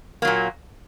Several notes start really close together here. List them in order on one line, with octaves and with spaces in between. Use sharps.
A#3 F#3 A#2